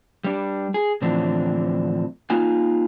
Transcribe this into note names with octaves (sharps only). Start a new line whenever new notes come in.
G3 D4
G#4
A2 D3 E3 F3 C4 D4
A#3 D#4 F4 G#5